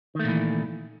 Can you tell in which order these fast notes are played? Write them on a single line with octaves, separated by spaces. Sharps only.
D#3 A3 A#2 E3